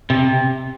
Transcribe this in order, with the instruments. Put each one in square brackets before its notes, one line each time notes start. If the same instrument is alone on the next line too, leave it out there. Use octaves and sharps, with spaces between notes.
[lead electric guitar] C3